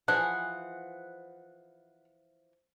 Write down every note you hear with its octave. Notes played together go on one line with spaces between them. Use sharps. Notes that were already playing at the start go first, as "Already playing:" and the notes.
E3 F3 G#4 F#5